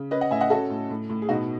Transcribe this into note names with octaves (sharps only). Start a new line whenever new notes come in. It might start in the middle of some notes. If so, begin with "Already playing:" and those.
Already playing: C#3
C#4 B4 D#5
D#5 F#5
A2 E5 G#5
D#5 F#5
C#4 F#4 A4
A2
A2
A2
G#4
B2 D#4 F#4